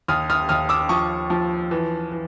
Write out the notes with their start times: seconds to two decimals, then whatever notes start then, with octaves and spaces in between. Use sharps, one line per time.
0.08 D#2 D#6 F6
0.30 D#6 F6
0.49 D#2 D#6 F6
0.69 D6 E6
0.89 F3 C#6 D#6
1.30 F3
1.71 E3
2.12 E3